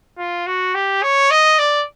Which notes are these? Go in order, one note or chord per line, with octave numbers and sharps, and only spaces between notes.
F4
F#4
G4
C#5
D#5
D5